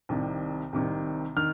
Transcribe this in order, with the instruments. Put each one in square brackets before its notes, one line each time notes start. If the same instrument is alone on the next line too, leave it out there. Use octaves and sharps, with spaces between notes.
[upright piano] C2 C3 D#3
C2 C3 D#3
D#3 F6